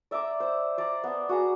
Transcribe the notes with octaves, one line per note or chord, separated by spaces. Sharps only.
D5 E5 A#5 D6
C5
C5 D5 F5 A#5
B3 A5
F#4 G#4 A#5